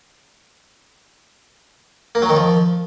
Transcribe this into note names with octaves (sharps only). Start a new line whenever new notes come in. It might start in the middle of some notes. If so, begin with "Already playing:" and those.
A#3
F#3
D#3
F3